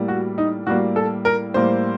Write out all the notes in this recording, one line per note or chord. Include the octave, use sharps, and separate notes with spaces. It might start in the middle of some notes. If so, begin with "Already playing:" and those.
Already playing: A2 G3 A#3
F#4
D#4
A2 G3 A#3 F#4
A4
A#4
A2 G3 A#3 C5